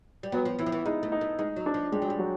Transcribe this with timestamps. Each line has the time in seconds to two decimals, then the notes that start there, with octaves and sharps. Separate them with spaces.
0.23 G3
0.32 F#3 B3
0.45 F3
0.59 E3 E4
0.66 F3
0.72 E3
0.86 G#3 D#4
1.03 A3
1.12 D#4
1.21 A3
1.39 G#3 D#4
1.56 F#3
1.66 D4
1.74 F3
1.92 G3 G#3
2.02 F#3
2.10 G3
2.19 F#3